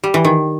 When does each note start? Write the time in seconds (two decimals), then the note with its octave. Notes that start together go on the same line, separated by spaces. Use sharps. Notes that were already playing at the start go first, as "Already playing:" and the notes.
0.04 G3
0.14 E3
0.25 D#3